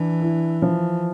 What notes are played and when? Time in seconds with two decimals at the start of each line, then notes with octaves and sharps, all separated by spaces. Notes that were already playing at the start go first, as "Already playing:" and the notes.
Already playing: E3 D4
0.21 E4
0.62 F3